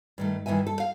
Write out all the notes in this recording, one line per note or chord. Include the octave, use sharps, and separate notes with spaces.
G2 D#3 A3
G2 D#3 E3 E5 G#5
A4
F5